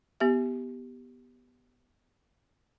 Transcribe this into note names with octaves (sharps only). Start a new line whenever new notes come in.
B3 G4 E5